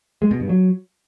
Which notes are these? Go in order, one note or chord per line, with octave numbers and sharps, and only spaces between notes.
G#3
B2
G2
F#3